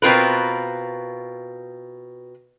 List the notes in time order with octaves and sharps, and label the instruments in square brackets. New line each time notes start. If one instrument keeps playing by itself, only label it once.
[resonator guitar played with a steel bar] B2 C4 F4 A#4 B4